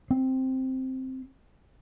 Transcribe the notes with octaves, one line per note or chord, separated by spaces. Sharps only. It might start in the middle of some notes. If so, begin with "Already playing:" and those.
C4